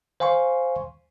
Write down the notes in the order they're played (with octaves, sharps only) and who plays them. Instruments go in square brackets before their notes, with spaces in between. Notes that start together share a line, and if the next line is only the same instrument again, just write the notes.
[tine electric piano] C5 F5 G#5 C6 C#6